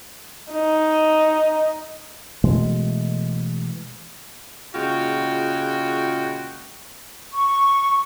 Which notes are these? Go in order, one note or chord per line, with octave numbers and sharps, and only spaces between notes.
D#4
B2 E3 G#3 A3
A#2 C#3 G#3 F4 F#4 G5
C#6